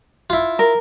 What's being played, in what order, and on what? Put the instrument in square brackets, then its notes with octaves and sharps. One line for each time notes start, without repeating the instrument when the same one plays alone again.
[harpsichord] E4 F4
[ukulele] A#4